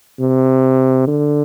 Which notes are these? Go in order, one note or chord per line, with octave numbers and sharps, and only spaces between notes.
C3
D3